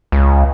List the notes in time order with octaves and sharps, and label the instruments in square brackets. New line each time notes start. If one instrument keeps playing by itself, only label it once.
[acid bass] C#2